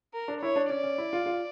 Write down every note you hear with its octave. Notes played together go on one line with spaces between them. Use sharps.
A#4
D4
E4 C#5
D4
C#4 D5
C#4
E4
F4
F4